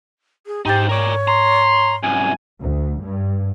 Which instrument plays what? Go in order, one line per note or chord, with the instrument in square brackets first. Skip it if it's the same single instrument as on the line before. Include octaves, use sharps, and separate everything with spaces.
[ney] G#4
[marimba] G#2 G5 A6 [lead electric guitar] D#4 C5 [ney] G4
[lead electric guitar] A#4 D5 [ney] C#5
[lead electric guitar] A#5 [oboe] C6
[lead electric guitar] C2 F#2 [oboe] G#5
[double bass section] D2
G2